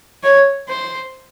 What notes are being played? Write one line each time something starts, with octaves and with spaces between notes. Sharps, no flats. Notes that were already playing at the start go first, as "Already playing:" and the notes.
C#5
C5